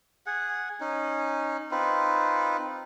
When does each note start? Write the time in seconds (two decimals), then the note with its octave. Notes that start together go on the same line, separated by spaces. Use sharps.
0.26 G#4 F#5
0.81 C#4 D#4
1.71 C4 D#4 F4 B4